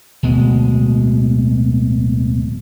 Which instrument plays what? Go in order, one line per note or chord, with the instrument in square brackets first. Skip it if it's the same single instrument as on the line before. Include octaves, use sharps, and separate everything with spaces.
[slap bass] D1 B2 G#3